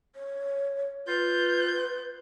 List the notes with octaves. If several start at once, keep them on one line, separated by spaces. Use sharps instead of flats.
C#5
F4 B4 G6